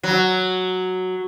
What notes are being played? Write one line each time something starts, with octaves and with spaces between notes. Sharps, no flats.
F#3